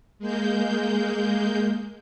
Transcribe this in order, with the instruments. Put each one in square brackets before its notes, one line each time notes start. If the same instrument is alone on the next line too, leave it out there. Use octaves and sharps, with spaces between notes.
[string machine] G#3 A#3 G6